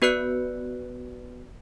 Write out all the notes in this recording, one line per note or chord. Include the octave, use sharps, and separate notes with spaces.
B3 F#4 B4 D5 F#6 C#7